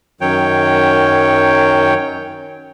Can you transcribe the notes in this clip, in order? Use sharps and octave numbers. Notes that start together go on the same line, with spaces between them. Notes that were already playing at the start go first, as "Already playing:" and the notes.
F#2 D#3 F#3 C#5 G5